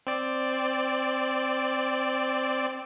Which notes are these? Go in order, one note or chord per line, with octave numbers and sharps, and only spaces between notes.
C4 D5